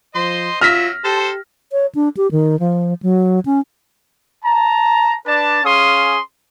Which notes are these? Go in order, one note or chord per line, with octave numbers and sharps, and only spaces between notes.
F3 C5 D#5 C6
F#3 F4 E5 F6 A#6 B6
G4 A4 C5 A5
C#5
D4
G4
D#3
F3
F#3
C#4
A5 A#5
D4 B4 D5 A5
C#4 G#4 F5 C6 D#6